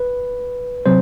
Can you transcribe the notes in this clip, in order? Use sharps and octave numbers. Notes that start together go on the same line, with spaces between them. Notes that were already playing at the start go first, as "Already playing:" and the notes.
Already playing: B4
C3 F#3 C4 C5